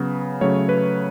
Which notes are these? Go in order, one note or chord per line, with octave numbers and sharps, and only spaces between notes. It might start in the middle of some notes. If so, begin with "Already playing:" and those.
Already playing: C#3 F#3 B3 B4
C#3 F#3 A3 C#5
B4